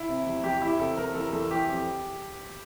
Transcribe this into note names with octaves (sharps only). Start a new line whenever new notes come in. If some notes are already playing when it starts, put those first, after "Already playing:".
Already playing: E4
C3
E2
E2 G4
E3 E4
C3 A4
E2 A#4
E3 A4
E2 A4
E3 G4
F2